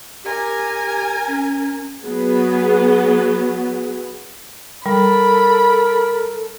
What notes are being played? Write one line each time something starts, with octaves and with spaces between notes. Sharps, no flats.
G4 A#4 G#5
C#4
F#3 B3 G#4
G3 A4 A#4 B5